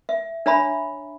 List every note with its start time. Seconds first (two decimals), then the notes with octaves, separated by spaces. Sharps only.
0.09 E5
0.46 D4 C#5 E5 A#5 B5